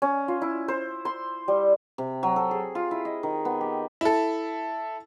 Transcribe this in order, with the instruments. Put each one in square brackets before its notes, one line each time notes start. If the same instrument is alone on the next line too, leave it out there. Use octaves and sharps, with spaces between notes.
[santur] C#4
F4
E4
C5
C6
G3
[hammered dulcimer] C3
F#3
A4
G#4
F4
E4
D#5
D#3
B3
G4
[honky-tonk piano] E4 A4